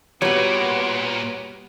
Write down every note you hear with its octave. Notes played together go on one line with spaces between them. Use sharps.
A#2 G3 B3 F#4 C#5 D7